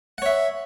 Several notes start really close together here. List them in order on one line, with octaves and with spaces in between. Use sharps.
F#5 C#5 E5